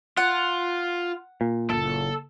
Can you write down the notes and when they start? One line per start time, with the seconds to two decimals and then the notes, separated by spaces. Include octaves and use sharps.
0.17 F4 F#5
1.41 A#2
1.70 F#1 A4